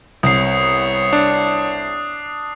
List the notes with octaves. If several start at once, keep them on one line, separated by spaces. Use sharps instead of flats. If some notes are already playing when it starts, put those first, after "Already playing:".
C2 B3 C#5 D#6 C7
D4